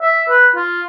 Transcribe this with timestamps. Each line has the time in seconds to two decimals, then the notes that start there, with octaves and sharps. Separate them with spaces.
0.02 E5
0.29 B4
0.56 F4